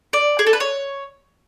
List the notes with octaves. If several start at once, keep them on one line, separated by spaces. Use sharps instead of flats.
D5
G#4
A4
B4
C#5